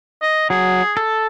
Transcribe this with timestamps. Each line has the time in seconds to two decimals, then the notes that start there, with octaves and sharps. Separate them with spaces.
0.22 D#5
0.50 F#3 G#4
0.97 A4